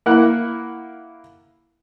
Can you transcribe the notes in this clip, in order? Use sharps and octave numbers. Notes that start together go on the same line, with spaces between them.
A#3 E4 A#4 F#5 F#6